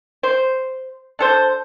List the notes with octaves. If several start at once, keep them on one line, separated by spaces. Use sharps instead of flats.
C5
D4 A4 C5